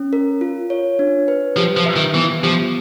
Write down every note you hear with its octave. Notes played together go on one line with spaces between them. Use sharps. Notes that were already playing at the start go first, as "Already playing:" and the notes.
Already playing: C#4
A#4
F4
C#5
D4
B4
F3 G4
F3
E5
D#3
E3 B3
F3 G4